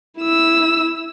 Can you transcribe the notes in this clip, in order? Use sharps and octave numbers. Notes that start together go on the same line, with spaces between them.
E4 E6